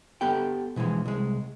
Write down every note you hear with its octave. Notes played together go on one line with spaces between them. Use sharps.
B3 G4 A4 G5
B2 E3 F3 G#3
C2 G#3